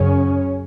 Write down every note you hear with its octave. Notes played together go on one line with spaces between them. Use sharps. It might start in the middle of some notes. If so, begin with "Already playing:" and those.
Already playing: F#2 C#3 C#4